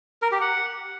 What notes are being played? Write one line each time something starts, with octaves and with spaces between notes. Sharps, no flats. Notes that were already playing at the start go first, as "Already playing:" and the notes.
A#4
G4
F#5